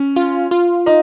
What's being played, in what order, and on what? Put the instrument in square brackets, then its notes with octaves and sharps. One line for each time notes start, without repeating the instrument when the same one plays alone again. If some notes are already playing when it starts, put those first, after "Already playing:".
Already playing: [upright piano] C#4
[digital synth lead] F4
F4
[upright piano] D#4